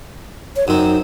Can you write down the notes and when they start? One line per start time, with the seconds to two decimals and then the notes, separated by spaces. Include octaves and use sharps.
0.56 C#5
0.68 F#2 C4 D#4